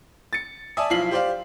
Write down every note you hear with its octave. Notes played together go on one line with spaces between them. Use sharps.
A6 C#7
D5 E5 G#5 A5 D#6
B1 F3 E4 F4 C7 F#7
G4 C5 D5 F5